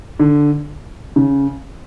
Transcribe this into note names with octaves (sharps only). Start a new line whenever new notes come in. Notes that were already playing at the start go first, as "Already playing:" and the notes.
D3
C#3